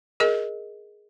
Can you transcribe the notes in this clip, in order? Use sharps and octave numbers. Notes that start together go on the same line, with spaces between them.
G#4 A#4 D#5